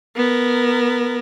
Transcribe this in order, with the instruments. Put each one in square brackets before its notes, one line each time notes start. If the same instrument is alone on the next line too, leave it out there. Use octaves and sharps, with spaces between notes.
[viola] B3 A#4